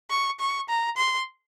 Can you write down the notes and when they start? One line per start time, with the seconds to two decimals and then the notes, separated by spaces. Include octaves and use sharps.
0.10 C#6
0.40 C#6
0.69 A#5
0.97 C6